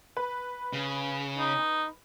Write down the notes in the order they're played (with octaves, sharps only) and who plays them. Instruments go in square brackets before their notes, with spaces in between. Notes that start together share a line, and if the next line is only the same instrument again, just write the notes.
[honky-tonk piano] B4
[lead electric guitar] C#3
[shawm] D#4